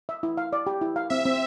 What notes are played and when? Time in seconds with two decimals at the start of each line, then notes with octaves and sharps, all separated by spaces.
0.09 E5
0.23 E4
0.37 F5
0.53 D5
0.67 G4
0.81 E4
0.96 F5
1.10 C4 E5
1.25 C4